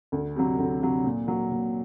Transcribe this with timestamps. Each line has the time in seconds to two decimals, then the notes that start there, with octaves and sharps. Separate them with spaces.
0.12 D2
0.36 C3 F#3
0.58 D2
0.82 C3 F#3
1.04 A#2
1.27 F#3 A#3
1.51 A#2